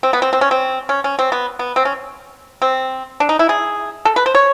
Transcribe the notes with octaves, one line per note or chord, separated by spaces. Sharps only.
C4
B3
C4
C4
C#4
C4
C#4
C#4
C4
B3
B3
C4
C#4
C4
D4
D#4
E4
G#4
A4
B4
C5
C#5